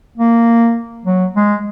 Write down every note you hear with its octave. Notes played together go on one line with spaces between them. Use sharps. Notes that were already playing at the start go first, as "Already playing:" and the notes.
A#3
F#3
G#3